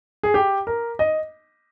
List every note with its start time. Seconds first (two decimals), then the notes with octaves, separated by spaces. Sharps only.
0.23 G#4
0.34 G4
0.67 A#4
0.99 D#5